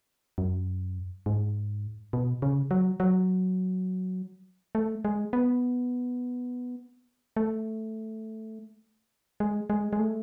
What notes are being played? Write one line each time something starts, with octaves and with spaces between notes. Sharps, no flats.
F#2
G#2
B2
C#3
F#3
F#3
A3
G#3
B3
A3
G#3
G#3
G#3
A3